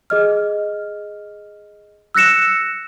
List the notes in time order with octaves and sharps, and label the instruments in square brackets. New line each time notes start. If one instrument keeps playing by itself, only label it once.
[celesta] G#4 D#5 F6
E6 F#6 A#6 C#7 E7